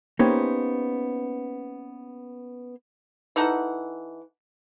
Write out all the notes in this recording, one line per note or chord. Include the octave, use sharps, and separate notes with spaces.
A#3 B3 C#4 D#4 G4 C5
E3 D#4 A4 F#5